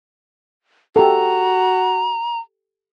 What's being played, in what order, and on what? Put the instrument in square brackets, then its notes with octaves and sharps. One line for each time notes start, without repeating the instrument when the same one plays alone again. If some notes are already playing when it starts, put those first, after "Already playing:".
[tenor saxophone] F#4 [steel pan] G4 A4 [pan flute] A#5